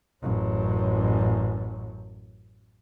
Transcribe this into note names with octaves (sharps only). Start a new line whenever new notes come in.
A1 F#2